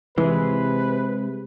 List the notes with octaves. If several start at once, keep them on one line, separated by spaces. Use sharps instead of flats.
C3 E3 G#3 G#4 B4